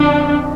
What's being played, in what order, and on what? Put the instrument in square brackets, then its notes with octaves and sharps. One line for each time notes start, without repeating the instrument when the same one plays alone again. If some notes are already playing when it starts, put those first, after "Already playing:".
Already playing: [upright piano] F2 D3 F3 C4 D#4 [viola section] D4